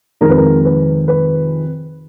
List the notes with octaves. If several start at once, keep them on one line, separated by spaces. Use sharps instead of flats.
F2 C3 D#3 G#3 A#4
B4
A#4
B4
B4